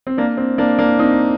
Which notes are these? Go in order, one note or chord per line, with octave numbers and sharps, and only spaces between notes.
C4
A#3 D4
C4
A#3 D4
A#3 D4
C4 D#4